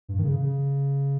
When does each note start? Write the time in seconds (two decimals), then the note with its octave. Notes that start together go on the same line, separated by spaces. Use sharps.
0.09 G2
0.18 D#3
0.24 C#3
0.40 C#3